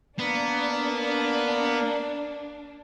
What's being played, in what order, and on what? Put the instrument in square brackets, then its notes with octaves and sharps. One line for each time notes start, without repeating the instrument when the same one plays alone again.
[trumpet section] A#3 [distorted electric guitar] B3 [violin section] D4